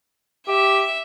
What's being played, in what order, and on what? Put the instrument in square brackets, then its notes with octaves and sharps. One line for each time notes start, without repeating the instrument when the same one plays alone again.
[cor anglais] G4 [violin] E5